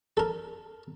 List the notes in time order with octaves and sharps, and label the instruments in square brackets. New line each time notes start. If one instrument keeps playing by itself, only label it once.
[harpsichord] A4 A#4